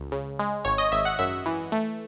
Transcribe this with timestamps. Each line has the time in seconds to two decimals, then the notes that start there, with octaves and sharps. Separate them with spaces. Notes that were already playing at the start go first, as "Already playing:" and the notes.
Already playing: C#2
0.12 C#3
0.39 G#3
0.65 G#1 C#5
0.78 D#5
0.91 G#1 E5
1.05 F#5
1.19 F#2 E5
1.46 E3
1.72 A3